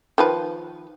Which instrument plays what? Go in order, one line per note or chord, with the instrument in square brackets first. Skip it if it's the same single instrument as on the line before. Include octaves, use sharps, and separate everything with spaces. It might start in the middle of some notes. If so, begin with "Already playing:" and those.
[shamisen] D#3 F3 B4